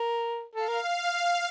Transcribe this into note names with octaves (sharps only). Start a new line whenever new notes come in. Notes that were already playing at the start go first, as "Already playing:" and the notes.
Already playing: A#4
A4 F5
A#4